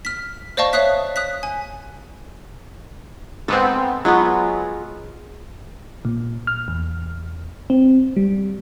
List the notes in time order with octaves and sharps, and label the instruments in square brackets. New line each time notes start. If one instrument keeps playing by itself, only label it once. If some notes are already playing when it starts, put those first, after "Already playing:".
[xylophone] F6 B6
C5 D5 D#5 F5 A5 C#6
C#5 E5 F5 D#6 F#6 B6
D#6 F#6 B6
G#5
[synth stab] G#2 B3 C4 [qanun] A4
[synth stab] F#3 B3 [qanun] G#3 F4
[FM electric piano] A#2
F6
E2
C4
G3